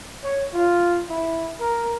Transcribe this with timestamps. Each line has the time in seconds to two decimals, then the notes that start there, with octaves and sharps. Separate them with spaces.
0.24 C#5
0.54 F4
1.10 E4
1.61 A#4